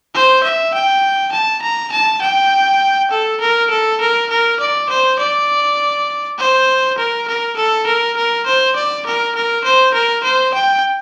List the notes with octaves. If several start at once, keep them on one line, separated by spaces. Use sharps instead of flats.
C5
E5
G5
A5
A#5
A5
G5
A4
A#4
A4
A#4
A#4
D5
C5
D5
C5
A#4
A#4
A4
A#4
A#4
C5
D5
A#4
A#4
C5
A#4
C5
G5